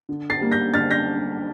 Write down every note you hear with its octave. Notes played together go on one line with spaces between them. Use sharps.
D3
A6 C7
G3 A#3
G6 A#6
D3 F6 A6
G6 A#6